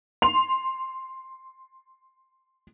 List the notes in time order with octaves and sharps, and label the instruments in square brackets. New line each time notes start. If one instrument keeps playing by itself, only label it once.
[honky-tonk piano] C6 F7